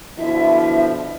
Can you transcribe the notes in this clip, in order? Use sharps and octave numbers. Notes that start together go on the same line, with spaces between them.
B2 D3 F3 E4 E5